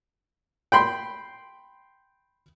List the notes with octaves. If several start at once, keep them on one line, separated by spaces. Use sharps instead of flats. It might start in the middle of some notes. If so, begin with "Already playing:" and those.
G5 B5 C6